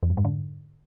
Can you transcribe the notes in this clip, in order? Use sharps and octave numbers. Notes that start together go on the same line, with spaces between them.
F2
G2
G#2
D3